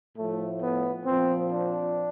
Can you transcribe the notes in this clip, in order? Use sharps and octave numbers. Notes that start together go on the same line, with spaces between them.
A2 F3 A3
B3
A#2 F3 C4
D4